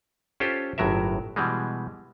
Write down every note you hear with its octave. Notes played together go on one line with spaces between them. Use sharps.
C#4 F4 G4 A4 C5
G1 A2 F#3 A#4 E5
B2 E3 G3 G#3